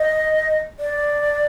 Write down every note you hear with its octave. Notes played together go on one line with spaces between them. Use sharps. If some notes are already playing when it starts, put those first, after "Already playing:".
Already playing: D#5
D5